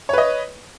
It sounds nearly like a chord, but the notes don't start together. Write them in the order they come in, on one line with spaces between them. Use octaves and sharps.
C#5 B4 D#5